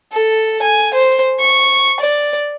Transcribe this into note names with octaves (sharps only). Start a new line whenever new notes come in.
A4
G#5
C5
C#6
D5